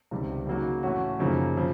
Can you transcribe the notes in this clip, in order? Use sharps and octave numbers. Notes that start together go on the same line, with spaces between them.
C#2 C3 D#3 G3
C#3 F#3 A#3 D#4 F#4
A2 E3 A3 C#4 F#4
F#2 C#3 F3 A#3 D#4
C#3 F3